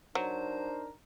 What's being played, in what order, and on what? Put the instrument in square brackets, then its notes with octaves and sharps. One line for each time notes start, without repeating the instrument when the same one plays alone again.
[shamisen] F#3 [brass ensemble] D4 D#4 A#4 [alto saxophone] C5